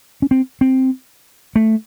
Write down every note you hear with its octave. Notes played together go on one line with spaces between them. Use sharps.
C#4
C4
C4
A3